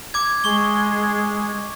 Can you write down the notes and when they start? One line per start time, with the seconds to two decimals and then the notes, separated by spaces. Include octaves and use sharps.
0.14 D6 G#6
0.44 G#3 C#6 G7